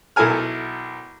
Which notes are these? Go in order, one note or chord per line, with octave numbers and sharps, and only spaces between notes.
B1 E4 A4 A#4 G#5 F6